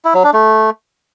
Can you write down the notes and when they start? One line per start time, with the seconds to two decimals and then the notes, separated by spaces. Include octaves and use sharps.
0.05 E4
0.14 F#3
0.24 D4
0.33 A3